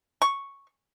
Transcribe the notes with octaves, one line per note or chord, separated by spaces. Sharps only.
C#6